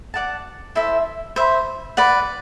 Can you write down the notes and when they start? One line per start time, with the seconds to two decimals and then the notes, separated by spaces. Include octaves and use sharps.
0.14 D5 F#5 A5
0.75 E4 A4 C5 E5
1.36 C5 E5 B5
1.97 B4 D5 F#5